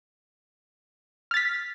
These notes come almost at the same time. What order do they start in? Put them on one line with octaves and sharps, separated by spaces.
F6 A6 B6